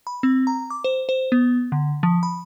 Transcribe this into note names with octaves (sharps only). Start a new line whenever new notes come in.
B5
C4
A#5
D6
C5
C5
B3
D3
F3
B5